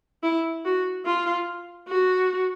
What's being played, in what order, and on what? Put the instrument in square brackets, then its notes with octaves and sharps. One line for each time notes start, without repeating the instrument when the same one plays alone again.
[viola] E4
F#4
F4
F#4